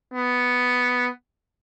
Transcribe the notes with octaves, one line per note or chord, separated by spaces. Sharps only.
B3